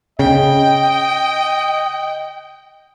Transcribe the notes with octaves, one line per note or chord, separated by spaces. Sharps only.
C#3 D#5 G5